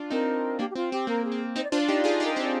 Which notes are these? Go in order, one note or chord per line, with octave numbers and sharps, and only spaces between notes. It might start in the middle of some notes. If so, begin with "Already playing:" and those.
Already playing: D4 F4
C4 D#4 A#4
A#3 D4 G4
G4
C4 F4
C4 G4
A#3 A#4
G#4
C4
C4 D#4 C5
D5
D4 F4 C5
D5
D#4 G4
F4 G#4
D#4 G4
A#4
C4 D#4 C5
D5